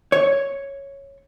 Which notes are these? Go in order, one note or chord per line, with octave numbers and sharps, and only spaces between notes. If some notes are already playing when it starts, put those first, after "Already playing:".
C#5